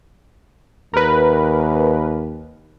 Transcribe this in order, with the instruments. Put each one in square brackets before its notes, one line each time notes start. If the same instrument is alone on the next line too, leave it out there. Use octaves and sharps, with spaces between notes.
[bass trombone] D#2 [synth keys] A#4 B4